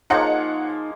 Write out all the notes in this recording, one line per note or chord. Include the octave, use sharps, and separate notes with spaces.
F3 G#3 A#3 D#4 C#5 F#5